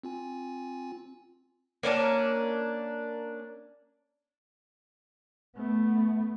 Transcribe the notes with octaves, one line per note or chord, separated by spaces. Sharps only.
C4 F4 G#5
A#3 C#4 D4 A5
A3 B3